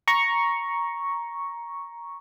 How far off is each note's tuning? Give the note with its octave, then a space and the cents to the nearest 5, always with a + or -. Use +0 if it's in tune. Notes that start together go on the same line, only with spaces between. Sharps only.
A#5 +10 C#6 +0